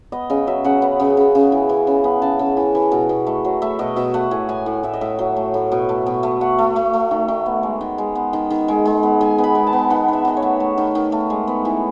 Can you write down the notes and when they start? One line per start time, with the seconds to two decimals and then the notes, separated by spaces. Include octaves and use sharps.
0.12 B3 D#5
0.30 C#3 D#5
0.47 F#3 E5
0.65 C#3 F#5
0.82 B3
1.00 C#3
1.17 C#3
1.35 C#3
1.52 E3
1.69 E3
1.87 C#3
2.04 B3
2.22 C#3 A5
2.39 C#3
2.57 E3
2.75 E3
2.92 B2
3.09 B2
3.27 A3
3.45 F#3
3.62 A3 E5
3.79 B2 D#5
3.96 B2 E5
4.14 A3 F#5
4.31 A2 G#5
4.49 A2 G#5
4.66 A2
4.83 A2 E5
4.94 D#5
5.01 A2 E5
5.19 F#3
5.37 A3
5.54 A2
5.72 B2
5.89 A3
6.06 B2
6.23 A3
6.41 A3 F#5
6.59 A3
6.76 A3
6.93 A3
7.11 D#3
7.28 D#3
7.46 B3
7.63 G#3
7.81 D#3
7.98 G#3
8.15 B3
8.33 D#3
8.50 D#3
8.68 G#3
8.85 G#3
9.03 B3
9.21 D#3 G#5
9.38 B3
9.44 B5
9.55 G#3
9.67 A5
9.73 B3
9.90 D#3 F#5
10.08 D#3 E5
10.25 D#3 D#5
10.37 C#5
10.42 A3
10.60 A3
10.78 D#3
10.95 D#3
11.12 A3
11.30 G#3
11.47 B3
11.65 E3